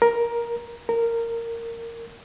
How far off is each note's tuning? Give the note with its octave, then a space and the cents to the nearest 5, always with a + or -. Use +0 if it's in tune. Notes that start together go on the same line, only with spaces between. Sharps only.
A#4 +10
A#4 -15